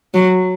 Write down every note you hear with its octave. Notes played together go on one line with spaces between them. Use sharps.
F#3